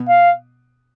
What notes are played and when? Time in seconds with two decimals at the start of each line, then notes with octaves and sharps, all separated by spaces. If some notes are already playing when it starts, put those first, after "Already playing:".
Already playing: B2 B3
0.08 F5